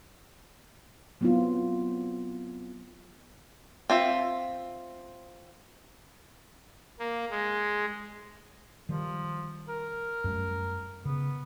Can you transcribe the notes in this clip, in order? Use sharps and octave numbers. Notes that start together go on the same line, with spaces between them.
F#3 B3 C4 E4 F4
C4 F4 E5
A#3
G#3
D#3 F3 G3
A#4
F#2 G3 A3
C#3 B3